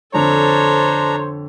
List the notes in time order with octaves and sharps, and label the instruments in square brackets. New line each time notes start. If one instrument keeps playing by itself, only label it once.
[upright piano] F2 D3 F7 [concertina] D4 A#5 [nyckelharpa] A4 C#5 [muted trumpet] C5